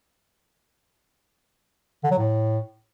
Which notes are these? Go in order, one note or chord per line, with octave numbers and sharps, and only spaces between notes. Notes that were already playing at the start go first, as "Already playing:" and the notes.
D3
F#3
A2